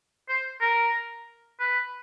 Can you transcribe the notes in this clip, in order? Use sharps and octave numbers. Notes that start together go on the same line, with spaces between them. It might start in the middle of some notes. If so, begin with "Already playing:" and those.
C5
A#4
B4